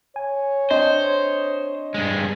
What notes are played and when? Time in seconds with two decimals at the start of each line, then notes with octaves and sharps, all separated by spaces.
0.16 C#5 G#5
0.71 C4 D4 C5 D#5
1.94 G2 G#3